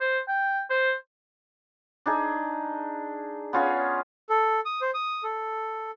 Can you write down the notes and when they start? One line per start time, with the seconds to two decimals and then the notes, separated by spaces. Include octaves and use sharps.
0.01 C5
0.28 G5
0.70 C5
2.06 D4 D#4 G#4
3.53 B3 C#4 F4 G#4
4.30 A4
4.65 D#6
4.81 C5
4.94 D#6
5.23 A4